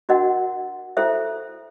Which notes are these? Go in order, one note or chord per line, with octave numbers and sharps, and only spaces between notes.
D4 F#4 A#4 D#5 F#5
E4 A4 C5 E5